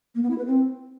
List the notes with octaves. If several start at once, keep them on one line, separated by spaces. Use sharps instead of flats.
A#3
B3
E4
B4
C4